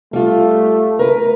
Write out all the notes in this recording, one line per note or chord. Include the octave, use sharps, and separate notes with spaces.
G3 A3 F4
A#4 B4